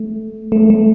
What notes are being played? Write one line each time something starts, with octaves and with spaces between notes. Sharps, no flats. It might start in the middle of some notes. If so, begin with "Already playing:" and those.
Already playing: A3
A3
A3